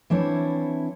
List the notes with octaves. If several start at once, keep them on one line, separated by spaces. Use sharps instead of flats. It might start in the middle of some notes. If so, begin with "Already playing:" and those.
E3 C4 D4 E4 C#5